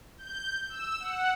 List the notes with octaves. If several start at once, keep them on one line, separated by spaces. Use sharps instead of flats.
G6
E6
F#5